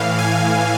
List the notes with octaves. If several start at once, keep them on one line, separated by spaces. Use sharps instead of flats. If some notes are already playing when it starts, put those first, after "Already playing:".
Already playing: A2 E3 F5
G#5